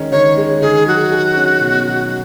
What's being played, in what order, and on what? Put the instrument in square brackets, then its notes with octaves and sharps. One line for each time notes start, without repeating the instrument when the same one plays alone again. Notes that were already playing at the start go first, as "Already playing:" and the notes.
Already playing: [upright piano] D#3 G#3 C#4
[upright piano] D#3 [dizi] C#5
[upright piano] G#3
[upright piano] D#3 [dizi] G#4
[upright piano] F#3 [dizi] F#4
[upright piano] G#4
C#4
B2
F#3